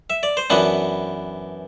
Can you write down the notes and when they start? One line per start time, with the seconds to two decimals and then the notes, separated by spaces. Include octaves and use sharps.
0.10 E5
0.23 D5
0.37 C5
0.50 F#2 E3 B3 D4 B4